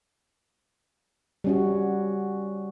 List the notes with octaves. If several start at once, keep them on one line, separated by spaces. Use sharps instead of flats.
G3 C#4 F#4